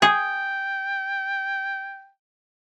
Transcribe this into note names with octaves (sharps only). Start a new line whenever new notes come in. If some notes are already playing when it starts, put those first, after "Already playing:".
G#4 G5